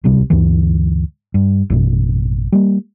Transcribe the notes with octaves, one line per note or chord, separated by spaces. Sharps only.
D1 C2 C3 G3
D2 G2 D3 E3
G2
A1 F#2 B2
G3 A#3